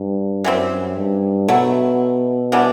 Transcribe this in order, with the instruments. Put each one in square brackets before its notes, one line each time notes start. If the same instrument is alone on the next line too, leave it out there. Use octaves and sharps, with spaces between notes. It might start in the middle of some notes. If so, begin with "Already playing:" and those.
Already playing: [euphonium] G2
[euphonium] F#2 [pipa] E3 G3 C4
[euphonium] G2
[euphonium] B2 [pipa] F#3 A3 E4
[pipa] E3 G3 B3 D4